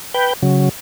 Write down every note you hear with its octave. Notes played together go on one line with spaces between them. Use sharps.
B4 G5
C#3 F#3